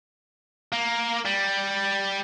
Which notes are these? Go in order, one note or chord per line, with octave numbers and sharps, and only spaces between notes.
A#3
G3